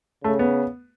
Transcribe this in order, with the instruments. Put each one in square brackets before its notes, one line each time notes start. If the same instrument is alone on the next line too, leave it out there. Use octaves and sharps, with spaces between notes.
[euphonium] C#3 [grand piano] A3
[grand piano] B3